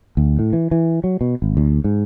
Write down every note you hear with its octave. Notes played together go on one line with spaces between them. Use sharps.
D2
A2
E3
E3
F#3
B2
G#1
D2
G#2